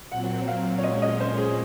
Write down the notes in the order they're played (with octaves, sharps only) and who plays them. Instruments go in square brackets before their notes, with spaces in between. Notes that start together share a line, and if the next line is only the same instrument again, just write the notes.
[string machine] A#2 F#3 C4 [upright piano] F#5
[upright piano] F5
C#5
[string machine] A#2 G#3 C#4 [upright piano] D#5
[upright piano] D#5
C5
G#4